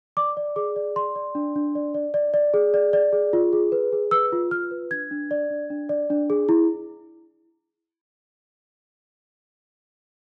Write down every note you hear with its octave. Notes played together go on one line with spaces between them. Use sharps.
D5 D6
D5
G#4 D6
D5
D5 C6
D5
D4
D4
D5
D5
D5
D5
G#4
D5
D5
G#4
F4
G#4
B4
G#4
B4 E6
F4
F4 F6
B4
D4 G#6
D4
D5
D4
D4
D5
D4
G#4
E4